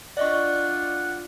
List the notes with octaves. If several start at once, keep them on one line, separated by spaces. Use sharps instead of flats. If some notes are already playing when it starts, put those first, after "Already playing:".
D4 F4 D5 D#5 F#5 C#6